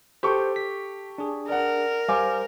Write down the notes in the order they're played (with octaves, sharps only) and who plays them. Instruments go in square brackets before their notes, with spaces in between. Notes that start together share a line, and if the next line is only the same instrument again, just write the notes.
[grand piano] G4 A4 C#6 [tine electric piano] C5
[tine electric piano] B6
D4 G#4
[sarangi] A#4 [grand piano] D5 F#5
[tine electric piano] G3 C5 [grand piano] F5 G#5 D6